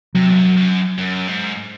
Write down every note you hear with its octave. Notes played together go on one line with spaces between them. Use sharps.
C3 F#3
F#2
F#2
F#2
G#2